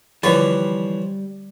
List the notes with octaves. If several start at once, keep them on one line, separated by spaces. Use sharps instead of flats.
D3 E3 F3 G3 B4 C#5